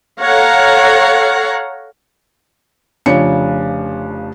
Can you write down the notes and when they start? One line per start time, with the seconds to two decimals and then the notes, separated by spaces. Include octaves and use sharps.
0.22 A4 C#5 F5 F#5 A#5
3.06 F1 C#3 F3 D4 C#5 C#7